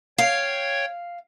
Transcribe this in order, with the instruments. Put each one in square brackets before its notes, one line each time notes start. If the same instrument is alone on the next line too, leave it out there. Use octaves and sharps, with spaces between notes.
[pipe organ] C#5 G5 G#6 [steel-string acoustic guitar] F5